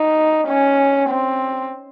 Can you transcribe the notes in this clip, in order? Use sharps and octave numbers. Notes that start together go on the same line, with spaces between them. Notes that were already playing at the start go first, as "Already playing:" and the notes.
Already playing: D#4
C#4
C4